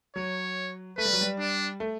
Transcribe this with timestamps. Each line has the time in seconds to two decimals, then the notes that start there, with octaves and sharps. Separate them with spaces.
0.16 F#3 C#5
0.98 A3 B4
1.05 G3
1.13 F#3
1.21 G3
1.39 D4
1.80 A3